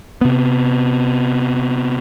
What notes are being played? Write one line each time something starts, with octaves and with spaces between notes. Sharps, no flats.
C3 B3